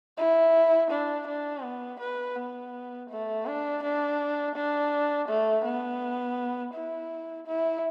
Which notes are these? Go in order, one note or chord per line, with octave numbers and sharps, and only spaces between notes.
E4
D4
D4
B3
B4
B3
A3
D4
D4
D4
A3
B3
E4
E4